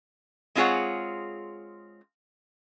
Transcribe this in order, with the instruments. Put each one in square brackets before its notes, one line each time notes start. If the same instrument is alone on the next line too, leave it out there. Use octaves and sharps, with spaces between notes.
[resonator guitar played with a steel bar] G#3 C4 F4 G#4 C#5 F#5